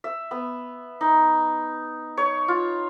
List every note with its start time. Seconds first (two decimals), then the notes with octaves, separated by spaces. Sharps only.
0.04 E5
0.31 B3
1.01 D#4
2.17 C#5
2.48 F4